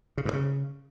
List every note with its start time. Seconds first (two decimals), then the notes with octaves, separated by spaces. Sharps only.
0.18 C#3
0.25 G2
0.33 C#3